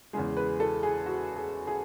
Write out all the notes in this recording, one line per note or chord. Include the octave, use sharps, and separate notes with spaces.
E2 C#3 G#3 G#4
B4
A4
G#4
F#4
G#4
G#4